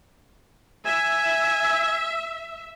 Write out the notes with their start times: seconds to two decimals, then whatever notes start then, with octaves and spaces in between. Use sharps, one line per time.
0.85 E5 G#5